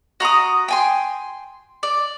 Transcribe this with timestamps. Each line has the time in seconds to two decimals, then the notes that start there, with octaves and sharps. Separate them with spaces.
0.20 F#4 A#5 C6 D#6
0.68 G5 G#5 C6
1.83 D5